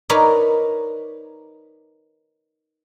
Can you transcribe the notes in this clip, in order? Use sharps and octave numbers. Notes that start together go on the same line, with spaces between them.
D#4 A#4 B4 C#5 D5